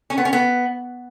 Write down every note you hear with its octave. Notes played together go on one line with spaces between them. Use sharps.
C#4
B3
C#4
B3